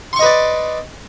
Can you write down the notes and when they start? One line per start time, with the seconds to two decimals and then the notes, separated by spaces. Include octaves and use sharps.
0.13 C6
0.16 C#6
0.19 D#5
0.23 B4
0.26 D5